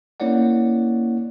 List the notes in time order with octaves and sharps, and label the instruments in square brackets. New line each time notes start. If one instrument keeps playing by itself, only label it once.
[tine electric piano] A#3 C#4 E4 C#5 D5 F#5